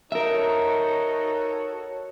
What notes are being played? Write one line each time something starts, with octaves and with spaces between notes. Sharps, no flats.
D#4 F#4 A4 A#4 C#5 E5